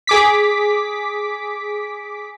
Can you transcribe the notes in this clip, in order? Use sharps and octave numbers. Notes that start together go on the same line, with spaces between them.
G#4 D6 B6